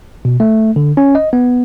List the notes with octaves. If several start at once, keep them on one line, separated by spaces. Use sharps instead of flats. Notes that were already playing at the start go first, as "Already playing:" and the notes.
B2
A3
D3
C#4
D#5
B3